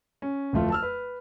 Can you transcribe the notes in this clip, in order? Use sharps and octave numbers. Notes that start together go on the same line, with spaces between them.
C#4
D1 F2 A3 F4
A5 E6 F6
B4